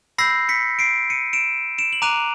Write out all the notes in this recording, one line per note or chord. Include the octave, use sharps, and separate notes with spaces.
B5 E6 G6 A#6 C7
B6 C#7
C7 D7
C#7 D#7
D7 E7
D7 E7
F#7
A#5 D6 F#6 D#7 F7